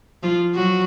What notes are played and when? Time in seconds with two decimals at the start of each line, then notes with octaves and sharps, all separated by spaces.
0.23 F3 F4
0.55 F#3 F#4